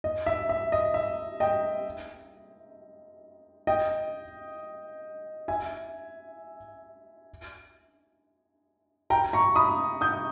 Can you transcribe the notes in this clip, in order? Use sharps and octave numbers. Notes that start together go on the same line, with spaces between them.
D#5
E5
E5
D#5
E5
D#5 G5
D#5 G5
E5 G#5
G5 A#5
A#5 C#6
B5 D#6
D#6 G6